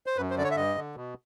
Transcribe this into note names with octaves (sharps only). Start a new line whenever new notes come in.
C5
F#2 B4
C5
D3 D5
C#5
E5
G2 D#5
D3
B2